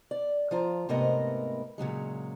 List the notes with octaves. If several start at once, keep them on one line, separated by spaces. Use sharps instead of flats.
D5
F3 F4 A#5
G#2 C3 A3 B3 A#4 D#5
A#2 C#3 F#3 G#3